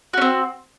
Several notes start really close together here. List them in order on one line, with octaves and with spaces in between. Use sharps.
F#4 C#4 C4